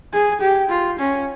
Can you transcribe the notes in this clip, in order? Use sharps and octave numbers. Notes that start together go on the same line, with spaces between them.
G#4
G4
F4
C#4